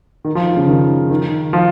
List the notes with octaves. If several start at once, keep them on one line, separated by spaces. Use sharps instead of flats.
D#3
F3
D#3
C#3
D#3
D#3
F3